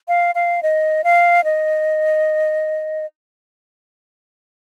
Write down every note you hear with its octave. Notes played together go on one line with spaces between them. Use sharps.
F5
F5
D#5
F5
D#5